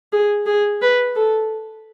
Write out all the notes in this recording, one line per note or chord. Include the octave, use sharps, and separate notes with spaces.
G#4
G#4
B4
A4